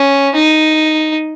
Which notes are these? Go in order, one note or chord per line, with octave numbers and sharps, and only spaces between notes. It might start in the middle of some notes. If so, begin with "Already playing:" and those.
Already playing: C#4
D#4